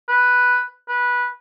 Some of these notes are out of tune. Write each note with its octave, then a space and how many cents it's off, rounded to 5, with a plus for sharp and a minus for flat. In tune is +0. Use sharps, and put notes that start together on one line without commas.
B4 +0
B4 -15